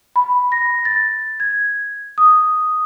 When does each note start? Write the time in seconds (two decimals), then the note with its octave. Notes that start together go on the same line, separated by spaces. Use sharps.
0.16 B5
0.52 A#6
0.85 A6
1.40 G#6
2.18 D#6